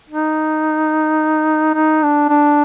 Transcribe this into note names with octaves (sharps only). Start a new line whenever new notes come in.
D#4
D#4
D4
D4